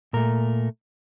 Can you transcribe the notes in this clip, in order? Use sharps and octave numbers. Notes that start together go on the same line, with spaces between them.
A#2 A3 A#4